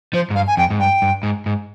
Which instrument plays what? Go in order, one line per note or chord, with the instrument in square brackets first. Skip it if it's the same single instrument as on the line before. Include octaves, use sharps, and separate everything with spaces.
[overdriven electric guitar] F3 [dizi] C5
[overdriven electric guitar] G#2
[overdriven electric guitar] G2 [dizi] F5
[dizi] G#5
[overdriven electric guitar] F2 [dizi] G5
[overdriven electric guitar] G#2
[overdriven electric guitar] G2 [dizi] G5
[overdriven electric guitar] G2
G#2
G#2